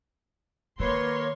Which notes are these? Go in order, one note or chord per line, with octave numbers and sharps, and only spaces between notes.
D#3 F#3 A#3 B4 C#5 C6